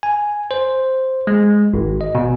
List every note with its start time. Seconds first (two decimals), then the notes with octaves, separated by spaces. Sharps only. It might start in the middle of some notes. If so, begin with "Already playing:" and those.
0.03 G#5
0.51 C5
1.27 G#3
1.74 G#1
2.01 D#5
2.15 B2